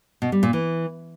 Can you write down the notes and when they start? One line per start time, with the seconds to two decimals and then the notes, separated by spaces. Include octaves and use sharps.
0.22 B2
0.32 G3
0.43 A#2
0.53 E3